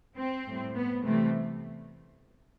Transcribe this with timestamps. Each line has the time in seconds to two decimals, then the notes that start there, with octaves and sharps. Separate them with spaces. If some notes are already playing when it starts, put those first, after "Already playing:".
0.17 C4
0.47 A2 G3
0.75 B3
1.05 C3 E3 G3 A3